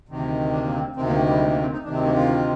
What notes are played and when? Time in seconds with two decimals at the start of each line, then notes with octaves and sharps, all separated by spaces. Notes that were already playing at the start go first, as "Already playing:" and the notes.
0.09 D2 C3 D#3
0.52 D4
0.64 A#3
0.74 C4
0.96 D2 C3 D#3 C4
1.07 A#3
1.18 A#3
1.29 G3
1.40 A3
1.50 A#3
1.61 C4
1.73 D#4
1.83 D2 C3 D#3 D4
1.94 C4
2.05 A#3
2.16 F4